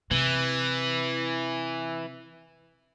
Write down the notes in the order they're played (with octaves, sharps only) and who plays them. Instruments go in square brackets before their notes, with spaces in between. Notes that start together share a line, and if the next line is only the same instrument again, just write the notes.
[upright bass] C3 [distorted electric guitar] E3